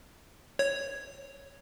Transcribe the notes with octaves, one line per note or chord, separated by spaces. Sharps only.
C#5